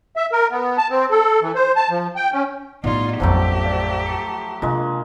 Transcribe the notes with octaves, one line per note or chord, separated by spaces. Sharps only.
E5
A#4
B3
A5
C4
A4
E3
C5
A5
F3
G5
C#4
A2 G3 B3 D#4 F4 D5 G#6
A1 F2 F3 F#3 A3 G4
C5 D5 F5
A5 C#7
C3 G#3 A#3 D4 F4 D#5